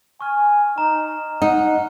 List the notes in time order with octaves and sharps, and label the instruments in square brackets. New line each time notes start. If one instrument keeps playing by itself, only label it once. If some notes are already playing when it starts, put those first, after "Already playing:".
[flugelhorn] G#5 [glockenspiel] C#6 F6
[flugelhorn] D#4 [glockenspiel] A#5
[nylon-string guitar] D#4 [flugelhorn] F#5